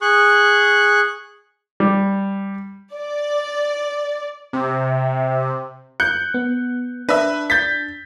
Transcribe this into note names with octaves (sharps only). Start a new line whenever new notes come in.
G#4 C#6 F#6
G3
D5
C3
F#6 G6 C#7
B3
D4 B4 E5
G6 A6 B6